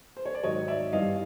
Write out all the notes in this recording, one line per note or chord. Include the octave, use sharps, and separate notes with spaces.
C5
C#5
D5
G#2 D#3 F#3 C#5 D#5
D5 E5
G2 E3 G3 B3 D#5 F5